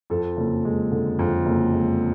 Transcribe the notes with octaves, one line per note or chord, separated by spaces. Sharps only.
F2 A4
F#1
G#3
D3
F2
F#1
G#3